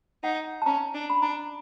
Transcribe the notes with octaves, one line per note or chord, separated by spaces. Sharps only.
D#4 F#5
A5
C#4 A#5
D4
B5
D4 A#5